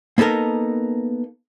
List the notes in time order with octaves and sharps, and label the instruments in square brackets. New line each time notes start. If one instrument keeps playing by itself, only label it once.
[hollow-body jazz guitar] A#3 B3 D#4 A4 A#4